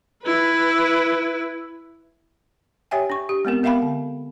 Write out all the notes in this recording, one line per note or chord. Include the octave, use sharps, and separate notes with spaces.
E4 B4
G4 C#5 E5 G5 G#5
D4 C#6
G4
G#3 B3 C4 A#4
B3 A#4 E5 F5 G5 B5
D3